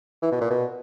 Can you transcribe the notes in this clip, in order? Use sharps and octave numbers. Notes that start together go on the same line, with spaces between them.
E3
B2
A#2
B2